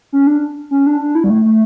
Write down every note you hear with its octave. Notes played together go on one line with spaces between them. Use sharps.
C#4
D4
C#4
D4
D4
E4
G3
A3
A3